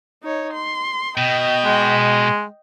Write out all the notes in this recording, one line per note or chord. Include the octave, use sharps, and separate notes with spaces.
D#4 C#5
C6
B2 D#5 G5
G#3